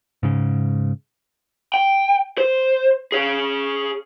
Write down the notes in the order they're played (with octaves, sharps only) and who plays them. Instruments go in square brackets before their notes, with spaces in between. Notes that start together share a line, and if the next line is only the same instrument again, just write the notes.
[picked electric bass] G#2 C#3
[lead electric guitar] G5
C5
G#4 C#5